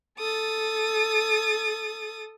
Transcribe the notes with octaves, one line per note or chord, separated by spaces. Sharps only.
A4 D#6 A6